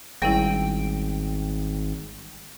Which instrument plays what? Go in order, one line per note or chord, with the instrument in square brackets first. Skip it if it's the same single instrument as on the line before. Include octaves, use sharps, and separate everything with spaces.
[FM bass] G#1 [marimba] G3 C#4 E4 [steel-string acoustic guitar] G5